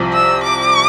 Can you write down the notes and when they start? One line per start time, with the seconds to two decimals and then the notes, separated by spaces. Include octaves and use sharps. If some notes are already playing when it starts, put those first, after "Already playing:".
Already playing: C2 C3 F3
0.13 E6
0.44 D6